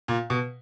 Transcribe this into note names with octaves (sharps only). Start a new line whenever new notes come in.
A#2
B2